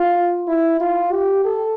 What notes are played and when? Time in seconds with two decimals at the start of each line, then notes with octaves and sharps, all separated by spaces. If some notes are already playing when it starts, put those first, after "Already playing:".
Already playing: F4
0.48 E4
0.80 F4
1.12 G4
1.45 A4